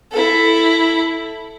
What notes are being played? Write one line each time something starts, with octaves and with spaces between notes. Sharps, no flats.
E4 A4